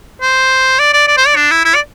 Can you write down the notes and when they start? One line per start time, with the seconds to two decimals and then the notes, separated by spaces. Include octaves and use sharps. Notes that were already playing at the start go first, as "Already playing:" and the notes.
0.22 C5
0.79 D5
0.93 D5
1.07 D5
1.17 C5
1.27 D5
1.36 D4
1.51 E4
1.65 E4
1.75 D5